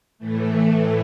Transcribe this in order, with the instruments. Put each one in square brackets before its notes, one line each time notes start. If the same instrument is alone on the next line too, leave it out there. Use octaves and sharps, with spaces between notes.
[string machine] A2 E3 A3